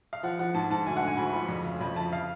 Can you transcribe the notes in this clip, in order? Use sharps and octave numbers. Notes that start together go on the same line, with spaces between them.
F5
F3 F#5
F3 F#5
G#2 A5
G#2 A5
D2 G#5
F#5
D3
G#5
D2 B5
F3 B5
F2
C#3
F2 B5
F3 A5
F5